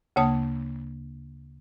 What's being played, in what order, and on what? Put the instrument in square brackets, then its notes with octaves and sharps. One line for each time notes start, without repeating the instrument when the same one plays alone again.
[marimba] D2 C#3 A#3 C#5 A5 D#6